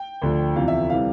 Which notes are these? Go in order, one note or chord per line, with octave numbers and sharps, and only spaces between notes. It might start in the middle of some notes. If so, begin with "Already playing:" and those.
Already playing: G5
D2 D3 F3
E2 C3 F3 F5
E5
C3 E3 G3 F5